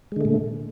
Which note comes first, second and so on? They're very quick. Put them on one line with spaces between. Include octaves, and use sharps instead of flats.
G#3 D3 A3 A#2